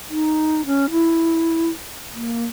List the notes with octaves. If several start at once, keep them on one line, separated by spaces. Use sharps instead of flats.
D#4
C#4
E4
A#3